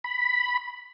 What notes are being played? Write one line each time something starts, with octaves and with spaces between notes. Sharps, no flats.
B5